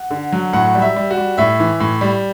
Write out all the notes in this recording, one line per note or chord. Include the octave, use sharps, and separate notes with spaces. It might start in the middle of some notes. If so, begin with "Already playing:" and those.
Already playing: F#5
D3
F#3
A2 F#5
G3
E5
G3
F#4
G3
A2 E5
E3
A2
G3